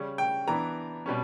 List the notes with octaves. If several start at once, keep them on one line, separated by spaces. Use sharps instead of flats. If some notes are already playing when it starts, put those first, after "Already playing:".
Already playing: C#3 G3 C#4
G5
E3 B3 D4 A#5
B2 G3 C#4